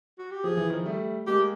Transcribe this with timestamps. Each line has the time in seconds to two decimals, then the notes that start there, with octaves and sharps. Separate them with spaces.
0.19 F#4
0.31 G4
0.44 F3 G#4
0.57 E3
0.70 D#3 F3
0.85 G3 A3
1.27 G#3 A#3 G4